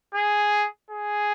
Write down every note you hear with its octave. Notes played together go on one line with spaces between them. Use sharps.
G#4
G#4